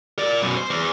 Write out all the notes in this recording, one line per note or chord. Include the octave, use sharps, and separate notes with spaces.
A#4 D5
F#2 B2
C5
E2